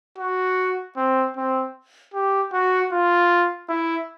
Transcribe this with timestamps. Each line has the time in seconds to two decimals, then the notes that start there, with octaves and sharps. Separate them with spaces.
0.19 F#4
0.96 C4
1.37 C4
2.14 G4
2.53 F#4
2.92 F4
3.69 E4